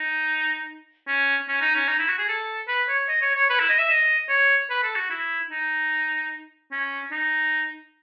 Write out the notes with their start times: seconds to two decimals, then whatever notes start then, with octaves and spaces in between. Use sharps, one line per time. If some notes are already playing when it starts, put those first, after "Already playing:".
Already playing: D#4
1.08 C#4
1.48 C#4
1.61 D#4
1.75 C#4
1.88 D#4
1.99 E4
2.08 F#4
2.18 G#4
2.28 A4
2.68 B4
2.88 C#5
3.09 D#5
3.22 C#5
3.35 C#5
3.50 B4
3.59 E4
3.70 D#5
3.79 E5
3.90 D#5
4.29 C#5
4.70 B4
4.83 A4
4.96 F#4
5.10 E4
5.50 D#4
6.72 C#4
7.11 D#4